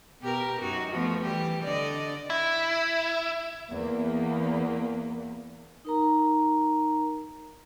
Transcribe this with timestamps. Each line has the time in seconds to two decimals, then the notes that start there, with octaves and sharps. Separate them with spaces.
0.21 B2 G4 A#4
0.61 F#2 D#4 F#4
0.90 F3 A3 B3
1.22 E3 G3 G4
1.62 D3 D5 D#5
2.30 E4
3.70 E2 A#3
5.85 D#4 A#4 A#5